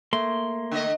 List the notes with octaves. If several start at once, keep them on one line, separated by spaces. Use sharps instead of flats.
A3 A#3 C6
D3 D#5